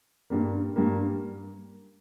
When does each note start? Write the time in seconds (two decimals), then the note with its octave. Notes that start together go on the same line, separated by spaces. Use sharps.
0.30 G2 G3 A#3
0.76 G2 G3 A#3